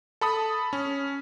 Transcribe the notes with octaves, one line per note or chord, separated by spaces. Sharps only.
A4 B5 D#6
C#4